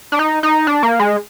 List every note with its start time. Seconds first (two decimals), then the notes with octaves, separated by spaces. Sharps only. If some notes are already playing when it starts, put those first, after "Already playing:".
0.12 D4
0.19 D#4
0.43 D#4
0.67 D4
0.83 A#3
1.00 G#3